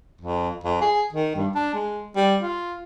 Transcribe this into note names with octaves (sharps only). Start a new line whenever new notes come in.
F2
F2
G#4
D#3
G2
D4
G#3
G3
F4